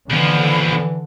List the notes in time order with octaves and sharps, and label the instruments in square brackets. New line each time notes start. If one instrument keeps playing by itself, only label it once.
[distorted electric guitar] D#2 F3 [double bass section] D3 [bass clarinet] E3 [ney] B5